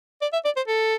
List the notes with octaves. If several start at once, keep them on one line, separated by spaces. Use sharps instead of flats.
D5
E5
D5
C5
A4